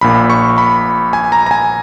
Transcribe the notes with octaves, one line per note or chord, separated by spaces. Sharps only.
A#1 A#2 B5
C#6
B5
G#5
A#5
A#5
G#5